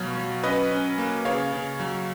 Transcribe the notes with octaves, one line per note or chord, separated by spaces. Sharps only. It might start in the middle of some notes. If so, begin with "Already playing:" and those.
Already playing: B2 F#3 C#5 F5
F#3
C#4 B4 D#5
C#4
A#3
C#3 C#5 F5
C#3
F#3